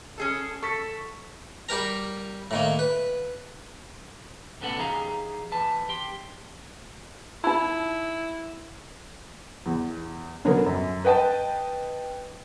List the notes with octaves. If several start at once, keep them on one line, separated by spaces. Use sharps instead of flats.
C#4 G#4 A4
A4 C#6 B6
G3 G4 A#4 A#5
A2 D#3 A#3
B4
C2 A2 B3 C#4 A4 F#5
E3 D#4 G4 G#4 F5 A#5
E3 B4 A5
G4 G5 C6
D#4 E4 B5
E2
B2 D3 F#3 B3 C#4 A#4
F#2
B4 D#5 G5 A5